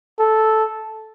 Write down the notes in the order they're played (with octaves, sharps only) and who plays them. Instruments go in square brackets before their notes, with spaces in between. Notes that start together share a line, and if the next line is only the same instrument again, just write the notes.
[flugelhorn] A4